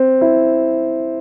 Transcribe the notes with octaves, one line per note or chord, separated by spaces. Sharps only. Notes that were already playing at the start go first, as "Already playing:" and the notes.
Already playing: C4
E4